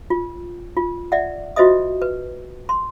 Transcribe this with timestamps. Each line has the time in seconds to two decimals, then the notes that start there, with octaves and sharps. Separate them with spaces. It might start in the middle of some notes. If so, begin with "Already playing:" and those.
0.10 F4
0.77 F4
1.12 D5 E5 F#5
1.56 F4 F#4 C5 D#5 E5 D#6
2.02 B4
2.69 C6